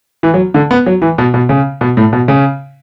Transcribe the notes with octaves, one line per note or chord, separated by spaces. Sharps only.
E3
F#3
D3
B3
F#3
E3
B2
B2
C#3
B2
A2
B2
C#3